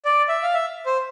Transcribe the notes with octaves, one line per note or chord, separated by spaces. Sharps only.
D5
E5
F5
E5
C5